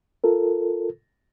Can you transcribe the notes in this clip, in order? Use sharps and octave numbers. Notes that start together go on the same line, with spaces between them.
F4 A4 A#4